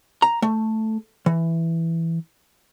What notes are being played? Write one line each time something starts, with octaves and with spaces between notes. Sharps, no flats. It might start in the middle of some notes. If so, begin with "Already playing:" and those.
A#5
A3
E3